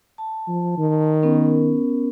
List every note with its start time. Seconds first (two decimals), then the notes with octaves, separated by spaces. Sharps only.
0.18 A5
0.48 F3
0.78 D#3
1.23 B3 C#4 A#4